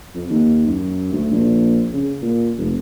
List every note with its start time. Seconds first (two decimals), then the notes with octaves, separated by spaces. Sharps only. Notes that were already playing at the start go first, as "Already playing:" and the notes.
0.14 F2
0.30 D#2
0.67 F#2
1.13 D2
1.32 A#1
1.93 C#3
2.22 A#2
2.58 F1